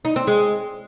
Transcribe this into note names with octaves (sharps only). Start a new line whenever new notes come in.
D#4
C4
G#3